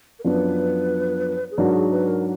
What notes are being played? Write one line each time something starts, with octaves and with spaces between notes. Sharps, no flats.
A#4
F#2 F3 B3 D4 B4
G#4
G#2 F#3 D4 F#4 A#4
G#4
B4
A#4